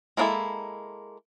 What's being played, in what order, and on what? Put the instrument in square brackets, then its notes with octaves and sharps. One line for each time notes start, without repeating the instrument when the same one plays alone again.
[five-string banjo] G#3 A#3 D4 E4 A4